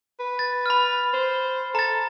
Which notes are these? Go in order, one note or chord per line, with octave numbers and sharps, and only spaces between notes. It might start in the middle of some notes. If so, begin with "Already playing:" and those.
B4
A6
B5 F6
C5
A4 A#5 A6